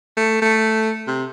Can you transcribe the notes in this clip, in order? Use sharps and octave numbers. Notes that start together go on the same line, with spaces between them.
A3
A3
C3